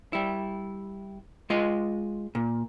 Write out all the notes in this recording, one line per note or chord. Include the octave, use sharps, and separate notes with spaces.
G3 E4
G#3 F4 D#5
A#2